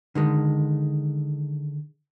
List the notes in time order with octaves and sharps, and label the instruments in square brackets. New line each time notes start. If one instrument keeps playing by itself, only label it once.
[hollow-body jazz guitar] D3 D#3 G#3